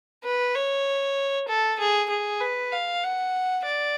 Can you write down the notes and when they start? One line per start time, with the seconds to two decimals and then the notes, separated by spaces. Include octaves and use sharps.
0.24 B4
0.55 C#5
1.48 A4
1.79 G#4
2.10 G#4
2.41 B4
2.72 F5
3.03 F#5
3.65 D5